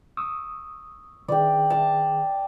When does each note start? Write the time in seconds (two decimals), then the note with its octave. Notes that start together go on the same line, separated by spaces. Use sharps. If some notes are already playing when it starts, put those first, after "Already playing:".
0.17 C#6 D#6 E6
1.28 D#3 G#4 D5 G5
1.70 A5